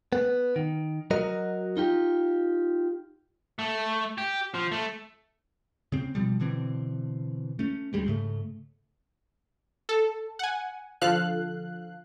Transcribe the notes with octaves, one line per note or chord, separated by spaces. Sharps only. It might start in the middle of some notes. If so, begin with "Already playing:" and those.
B3
D#3
F#3 F#4 A#4 D#5
D#4 F4 G4
A3
G4
F3
A3
C#3 C4
B2 F3 G3
B2 D3 E3 C4
A3 C#4
D2 G3 G#3
G#2 C#3 A3
A4
F#5 G#5
D3 F3 A4 F5 F#6